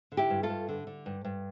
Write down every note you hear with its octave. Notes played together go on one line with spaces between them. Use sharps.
D3
E4 G4
G2
F4 A4
G2
D3
D3
G2
G2